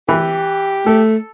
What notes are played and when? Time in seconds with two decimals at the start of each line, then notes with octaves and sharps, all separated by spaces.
0.09 E3 G4
0.86 A3 A4